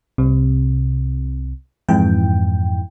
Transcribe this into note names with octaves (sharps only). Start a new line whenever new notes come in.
C2 C3
F2 G#2 E3 G5